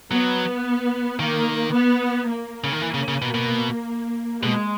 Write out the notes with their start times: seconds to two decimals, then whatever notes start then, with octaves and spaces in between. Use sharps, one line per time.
0.11 F#3 B3
1.20 D#3 A#3
1.73 B3
2.27 A#3
2.64 C#3
2.72 D#3
2.82 E3
2.94 C#3
3.08 C#3
3.22 B2
3.35 B2
4.43 B2 G#3